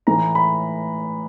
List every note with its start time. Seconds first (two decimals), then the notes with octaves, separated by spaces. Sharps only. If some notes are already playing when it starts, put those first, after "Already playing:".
0.07 A2 E3 A#5
0.35 B5